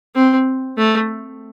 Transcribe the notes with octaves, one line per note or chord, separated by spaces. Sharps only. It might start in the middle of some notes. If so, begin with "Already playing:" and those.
C4
A3